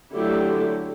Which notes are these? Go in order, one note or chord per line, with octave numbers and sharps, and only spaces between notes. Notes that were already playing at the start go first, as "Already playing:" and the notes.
D3 F#3 A3 E4 G4